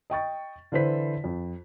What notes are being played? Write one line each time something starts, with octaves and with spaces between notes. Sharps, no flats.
D#5 G5 C#6 A6
D3 E3 E4 B4 C5 B6
F2